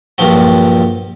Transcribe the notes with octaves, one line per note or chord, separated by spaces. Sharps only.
A#1 G2 F3 F#3